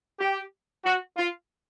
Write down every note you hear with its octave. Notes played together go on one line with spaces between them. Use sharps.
G4
F#4
F4